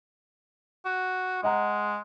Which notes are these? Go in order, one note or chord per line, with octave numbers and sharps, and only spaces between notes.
F#4
G#3 D#5 F#5 A#5